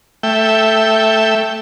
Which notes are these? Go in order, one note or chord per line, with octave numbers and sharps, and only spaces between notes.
A3 E5 G5